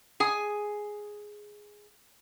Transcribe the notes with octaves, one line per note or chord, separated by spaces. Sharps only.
G#4 G#5